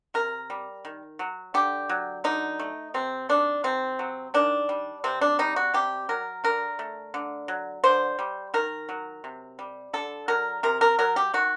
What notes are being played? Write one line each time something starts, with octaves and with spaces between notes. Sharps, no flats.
C3 A#4
G3
D#3
F#3
D3 G4
F#3
D3 D#4
A3
C3 C4
D#3 D4
C3 C4
F#3
D#3 D4
G3
C3 C4
D4
G3 D#4
F#4
C3 G4
F#3 A#4
D3 A#4
A3
D3
F#3
D3 C5
G3
D#3 A#4
F#3
C3
G3
D3 A4
F#3 A#4
C3 A#4
A#4
F#3 A#4
G4
D#3 F#4